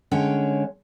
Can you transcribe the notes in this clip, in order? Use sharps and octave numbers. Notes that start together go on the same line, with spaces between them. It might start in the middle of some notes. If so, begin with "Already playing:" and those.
D3 G#3 C#4 C#5 G5